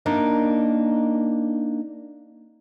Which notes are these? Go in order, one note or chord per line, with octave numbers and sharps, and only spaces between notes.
A#3 D4 D#4